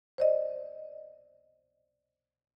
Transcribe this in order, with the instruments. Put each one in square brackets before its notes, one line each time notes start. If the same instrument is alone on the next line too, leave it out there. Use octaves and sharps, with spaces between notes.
[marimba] C5 D5 D#5